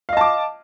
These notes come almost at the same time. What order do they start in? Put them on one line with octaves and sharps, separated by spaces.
F5 D#5 A5 D6